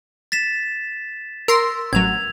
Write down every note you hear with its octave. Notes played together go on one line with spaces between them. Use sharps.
A6 B6 E7
A#4 C6 E6
A1 F#3 G#6 F7